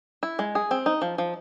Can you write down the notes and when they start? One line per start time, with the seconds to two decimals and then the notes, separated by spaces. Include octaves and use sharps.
0.23 E4
0.39 G#3
0.55 G#4
0.71 C4
0.86 D#4
1.02 F3
1.18 F3